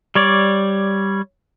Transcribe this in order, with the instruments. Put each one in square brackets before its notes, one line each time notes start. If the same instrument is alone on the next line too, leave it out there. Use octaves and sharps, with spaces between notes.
[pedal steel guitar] G3 C#5 D5